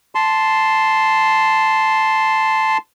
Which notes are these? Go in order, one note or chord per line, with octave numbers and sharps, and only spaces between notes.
A5 C6